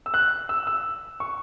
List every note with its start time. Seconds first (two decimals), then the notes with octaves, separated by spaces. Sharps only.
0.06 E6
0.14 F#6
0.49 E6
0.67 E6
1.20 C#6